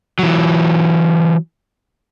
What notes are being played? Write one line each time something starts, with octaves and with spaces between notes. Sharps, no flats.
E3 F#3